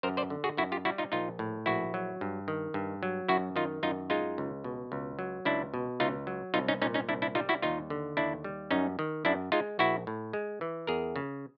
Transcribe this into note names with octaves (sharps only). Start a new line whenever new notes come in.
F#2 A#4 C5
C5 D5
D3
F#4 G#4
F#2 E4 F#4
F4 G4
G3 E4 F#4
D#4 F4
A#1 D#4 F4
A2
A#1 E4 F#4
F#3
G2
D#3
G2
F#3
F#2 E4 F#4
D#3 D#4 F4
F#2 D#4 F4
G#3 D#4 F4
C#2
B2
C#2
F#3
C#2 D4 E4
B2
C#2 D#4 F4
F#3
C2 D#4 F4
C#4 D#4
A#2 C#4 D#4
C#4 D#4
C2 D4 E4
D4 E4
G3 D#4 F4
E4 F#4
D#2 D#4 F4
D3
D#2 D4 E4
G3
F#2 C#4 D#4
D#3
F#2 D4 E4
G#3 D#4 F4
A#1 E4 F#4
A2
G#3
E3
E2 G#4 A#4
C#3